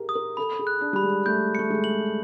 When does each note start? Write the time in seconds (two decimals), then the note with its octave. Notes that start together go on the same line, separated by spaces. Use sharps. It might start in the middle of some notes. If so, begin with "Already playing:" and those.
Already playing: G4 G#4 A#4
0.09 D#6
0.15 A#4
0.37 A4 B5
0.59 G#4
0.67 F#6
0.81 D4
0.93 G3 B5
1.03 G#3
1.26 A3 G6
1.55 A3 C#7
1.70 G#3
1.84 F#7